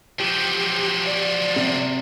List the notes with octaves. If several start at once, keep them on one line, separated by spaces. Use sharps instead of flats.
F3 F#3 G4
D5
C3